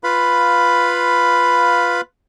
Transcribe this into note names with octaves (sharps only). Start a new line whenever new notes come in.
F4 B4 F5 B5